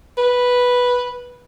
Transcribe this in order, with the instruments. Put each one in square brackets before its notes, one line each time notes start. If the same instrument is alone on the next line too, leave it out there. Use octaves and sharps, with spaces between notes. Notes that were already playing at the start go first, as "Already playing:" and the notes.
[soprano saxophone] B4